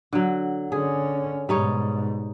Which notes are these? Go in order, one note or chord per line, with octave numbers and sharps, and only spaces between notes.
D3 F#3
D3 C#4 G#4
G#2 B2 G3 D#4 C#5